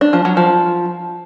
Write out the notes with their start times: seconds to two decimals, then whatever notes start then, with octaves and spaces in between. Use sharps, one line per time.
0.01 D4
0.13 F3
0.25 F#3
0.37 F3